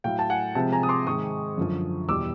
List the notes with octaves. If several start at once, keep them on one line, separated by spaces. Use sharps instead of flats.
A2 F#3 A3 F5 G5
A5
F#5 G#5
C3 F3 G#3 G5 A5
G#5 A#5
D#6
C6 D6
G#2 D#3 G#3 C#6 D#6
F#2 D3 F3
E2 B2 G3 D6 E6